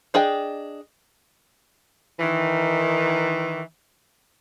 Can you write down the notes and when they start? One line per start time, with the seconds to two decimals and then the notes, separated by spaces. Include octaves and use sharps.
0.14 D4 G#4 D#5 G5
2.20 D#3 E3